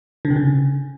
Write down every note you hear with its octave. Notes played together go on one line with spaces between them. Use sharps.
D3
C3
C#3